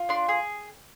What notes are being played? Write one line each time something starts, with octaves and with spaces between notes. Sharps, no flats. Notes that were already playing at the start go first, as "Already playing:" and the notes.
Already playing: F4
D4 C6
G#4